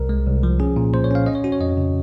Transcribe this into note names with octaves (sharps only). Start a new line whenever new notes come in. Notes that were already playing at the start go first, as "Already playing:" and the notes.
Already playing: C2 A#4
G#3
C2
F3
C#4 G#4
A#2
A#2 C5
C#5
C#4 F5
C#4 D#5
C#5
C#4 F#4
C#5
F2 D#5
C#3